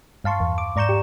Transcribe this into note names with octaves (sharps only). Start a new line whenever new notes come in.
G2 F5 A5 C6 C#6
E2
D6
G#2 D5 A#5 C#6 G6 E7
G4